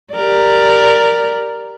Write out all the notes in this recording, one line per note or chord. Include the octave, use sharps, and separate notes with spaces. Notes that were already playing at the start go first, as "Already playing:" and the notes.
G4 A#4 D5